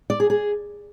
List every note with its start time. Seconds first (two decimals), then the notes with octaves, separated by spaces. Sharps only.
0.10 D5
0.20 G#4
0.30 G#4